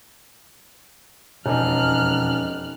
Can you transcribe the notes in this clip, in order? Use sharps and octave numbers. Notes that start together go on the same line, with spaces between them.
E1 F2 C#4 D#4 F6 F#6